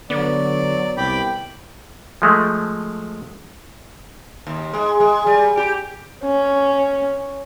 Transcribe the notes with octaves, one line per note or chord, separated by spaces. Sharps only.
D3 F#3 B3 D5
C2 G5 B5 D6
F3 G#3 A3
D#2
G#3
G#3
G3
G4
C#4